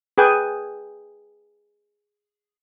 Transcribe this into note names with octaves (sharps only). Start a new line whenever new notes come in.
G#4 B4 G5 G#5